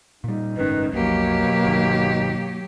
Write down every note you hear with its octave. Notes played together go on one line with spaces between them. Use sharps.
A#2 G3 D#4
F#1 G#2 D#3 C#4 B4
B1 F2 B2 F#3 A#3 G4
G1 D#3